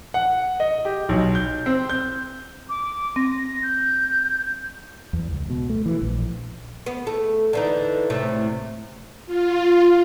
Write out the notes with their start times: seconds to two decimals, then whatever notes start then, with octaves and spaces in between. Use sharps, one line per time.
0.14 F#5
0.60 D#5
0.85 G4
1.09 B1
1.35 G6
1.66 C4
1.90 G6
2.69 D6
3.16 C4 A#6
3.63 G6
5.13 E2
5.32 C#2
5.50 B2
5.70 A3
5.86 E3
6.02 A#1
6.86 B3
7.07 A3
7.53 D3 E3 D#4
8.10 A2 C3 A3
9.26 F4